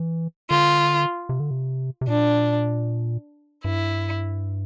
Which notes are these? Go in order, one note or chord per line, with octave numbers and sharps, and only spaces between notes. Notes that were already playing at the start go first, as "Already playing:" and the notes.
Already playing: E3
D3 F4
C3
D3
C3
C3
A#2 D4
G2 E4